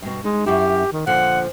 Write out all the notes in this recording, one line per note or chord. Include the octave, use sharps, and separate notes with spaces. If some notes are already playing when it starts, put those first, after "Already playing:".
G2 B2
G#3 D#4
F#2 E4 G4
D#3
A#2 D3 F3 F#5